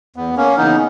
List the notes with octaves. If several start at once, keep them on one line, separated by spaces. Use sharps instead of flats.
E2 B3
A#3 C#4
C#3 E3 B3 D#4